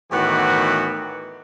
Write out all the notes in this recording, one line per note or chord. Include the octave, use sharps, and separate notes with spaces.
A2 D#3 E3 B3 F#4 G4